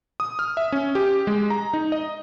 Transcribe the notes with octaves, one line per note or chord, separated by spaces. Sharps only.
D#6
F6
E5
C#4
G4
G#3
A#5
D#4
D#5